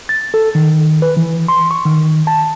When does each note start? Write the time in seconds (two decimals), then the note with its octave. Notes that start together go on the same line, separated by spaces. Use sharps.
0.09 A6
0.34 A4
0.55 D#3
1.02 B4
1.17 E3
1.48 C6
1.71 C#6
1.85 D#3
2.27 A5